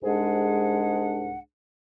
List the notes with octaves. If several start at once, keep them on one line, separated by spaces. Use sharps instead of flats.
C2 G#2 G#3 D4 G#4 F#5